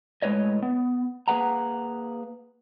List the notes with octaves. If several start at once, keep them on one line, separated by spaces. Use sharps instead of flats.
A2 G#3 B3 B4 C#5 D#5
B3
A#3 G#4 B4 F#5 A#5